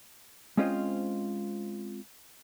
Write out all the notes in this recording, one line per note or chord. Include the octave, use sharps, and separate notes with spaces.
G#3 C4 C#4 F4 C5 D#5